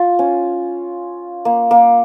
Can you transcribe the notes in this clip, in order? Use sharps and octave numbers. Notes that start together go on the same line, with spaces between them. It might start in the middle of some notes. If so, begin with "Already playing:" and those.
Already playing: F4
C#4
A#3
A#3